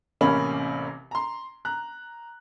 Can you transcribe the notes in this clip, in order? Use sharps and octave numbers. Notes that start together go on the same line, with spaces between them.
A1 C3 A#3 C#4 G4 B5
A#5 C6
A#5 F#6